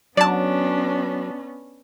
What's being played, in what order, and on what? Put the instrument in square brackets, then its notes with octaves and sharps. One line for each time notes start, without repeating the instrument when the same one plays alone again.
[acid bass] F#3 [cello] B3 C#4 [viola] D4 [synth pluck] D5 A5